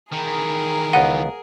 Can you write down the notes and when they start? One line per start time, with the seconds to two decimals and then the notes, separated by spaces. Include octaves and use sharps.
0.13 D#3 E3 G#4 A#4
0.93 C#2 B3 D#5 F#5